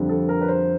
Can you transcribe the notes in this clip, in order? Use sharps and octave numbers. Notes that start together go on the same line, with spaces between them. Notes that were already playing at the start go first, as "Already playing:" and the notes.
Already playing: F2 D3 G3
A4
A#4
B4
C5